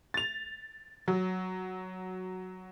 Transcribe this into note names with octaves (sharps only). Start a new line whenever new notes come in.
A6 F7
F#3